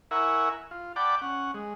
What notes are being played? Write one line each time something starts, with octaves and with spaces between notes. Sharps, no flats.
E4 A#4 E5 F#5 G#5 C#6
F4
D5 F#5 G5 A5 B5 D6
C#4 F#5
G#3